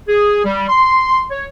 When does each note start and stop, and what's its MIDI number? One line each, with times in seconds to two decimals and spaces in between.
0.08 0.41 68
0.45 0.68 55
0.68 1.24 84
1.31 1.46 73